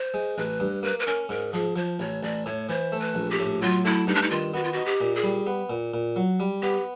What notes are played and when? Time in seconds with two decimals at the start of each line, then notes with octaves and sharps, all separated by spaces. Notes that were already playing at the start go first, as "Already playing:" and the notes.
Already playing: C5
0.14 G#3
0.38 A1 B4
0.60 G2
0.83 A#3 B4
1.00 B4
1.07 C#4 A#4
1.29 G#2 A#4
1.53 F3 G#4
1.76 F3 C5
1.99 A1 C#5
2.23 A1 D5
2.46 A2 C#5
2.69 E3 C5
2.92 A3
3.00 B4
3.15 A#1
3.31 G4
3.39 A2
3.62 F#3 F4
3.85 A3 E4
4.07 G2 D#4
4.15 D4
4.22 D#4
4.31 D#3 F4
4.54 B3 F#4
4.64 F4
4.73 D#4 F#4
4.86 G4
5.01 A#2
5.15 G#4
5.23 G3
5.47 B3
5.70 A#2
5.94 A#2
6.16 F#3
6.40 G3
6.62 B3 G4